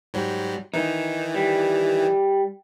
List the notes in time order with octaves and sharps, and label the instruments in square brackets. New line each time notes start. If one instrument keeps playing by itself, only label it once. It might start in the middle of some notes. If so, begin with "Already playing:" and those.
[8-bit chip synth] G#2 F#3 G3
[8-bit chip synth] D#3 E3 [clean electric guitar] D#4
[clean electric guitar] G3